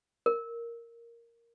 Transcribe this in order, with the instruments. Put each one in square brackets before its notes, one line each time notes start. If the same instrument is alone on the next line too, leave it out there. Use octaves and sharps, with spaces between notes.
[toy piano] A#4